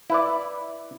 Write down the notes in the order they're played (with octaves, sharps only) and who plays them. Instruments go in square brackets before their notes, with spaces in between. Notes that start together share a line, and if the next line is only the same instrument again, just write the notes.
[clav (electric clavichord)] E4 B4 D5